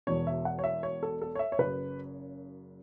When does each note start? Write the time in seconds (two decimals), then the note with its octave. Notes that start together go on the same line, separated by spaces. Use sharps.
0.07 E1 E2 B2 C#5
0.27 E5
0.45 F#5
0.59 C#5
0.64 E5
0.83 C#5
1.03 A4
1.22 A4
1.35 C#5
1.39 E5
1.52 C#5
1.59 F#1 F#2 C#3 B4